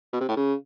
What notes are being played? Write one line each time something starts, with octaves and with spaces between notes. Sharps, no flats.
B2
C3
A2
C#3